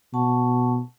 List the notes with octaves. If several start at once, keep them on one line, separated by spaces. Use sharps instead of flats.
B2 F#5 A5 C#6